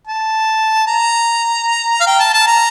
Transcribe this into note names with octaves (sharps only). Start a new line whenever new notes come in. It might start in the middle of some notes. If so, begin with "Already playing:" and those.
A5
A#5
F5
G5
A5
A5
A#5